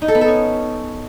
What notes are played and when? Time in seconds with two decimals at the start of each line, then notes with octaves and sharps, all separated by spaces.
0.02 D#4
0.08 A4
0.15 B3
0.21 A4
0.28 C#4